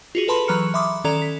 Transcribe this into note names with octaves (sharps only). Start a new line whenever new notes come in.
F4 F#4 G#4
G#4 A4 B4 A5 B5 C6
E3 F#3 B4 A#5 F6 C#7
E5 B5 C6 D6 D#6
D#3 C#4 A4 D5 A#5 F7
B6